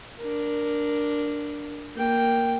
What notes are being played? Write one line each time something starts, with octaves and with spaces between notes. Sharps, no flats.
D4 A#4
A#3 G5